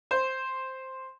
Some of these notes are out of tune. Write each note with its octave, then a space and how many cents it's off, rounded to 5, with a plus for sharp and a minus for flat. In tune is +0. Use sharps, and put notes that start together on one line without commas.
C5 +0